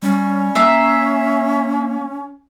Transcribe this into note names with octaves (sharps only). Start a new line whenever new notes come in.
G3 C#4
A#3 E5 F5 A#5